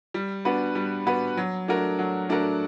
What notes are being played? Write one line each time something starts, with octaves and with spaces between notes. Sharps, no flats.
G3
B3 D4 F#4 B4
G3
B3 D4 F#4 B4
F#3
A3 D4 F#4 A#4
F#3
A3 D4 F#4 A#4